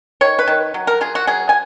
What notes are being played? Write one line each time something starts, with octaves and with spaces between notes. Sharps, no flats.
D#3 C#5
B4
D#3
F#3
A#4
F4 G#4
F#4
F#3 G#4
G#5